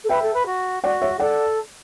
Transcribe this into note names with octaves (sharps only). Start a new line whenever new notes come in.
A4
B4 E5 G5
A4
B4
F#4
F#4 D5 F#5
C#5 E5
A4 D5 F#5